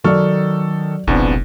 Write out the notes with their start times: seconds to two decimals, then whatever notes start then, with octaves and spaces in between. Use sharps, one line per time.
0.04 D#3 F#3 A4 D5 C#6 F6
1.07 F1 B1 E2 A#2 B3 C4 D4